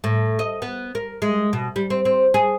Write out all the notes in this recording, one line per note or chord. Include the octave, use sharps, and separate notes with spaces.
A2
D#5
B3
A#4
G#3
B2
G3
C4
C4
G#4